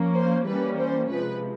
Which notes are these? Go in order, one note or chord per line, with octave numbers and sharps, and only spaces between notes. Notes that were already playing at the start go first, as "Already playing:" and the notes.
Already playing: F3 A#3 C#4
C5
E3 G3 A#3 C#4 B4
C5
C3 F3 G#3 B4